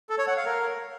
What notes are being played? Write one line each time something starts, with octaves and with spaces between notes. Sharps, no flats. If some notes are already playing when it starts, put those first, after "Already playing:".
A4
C#5
F#5
F5
A#4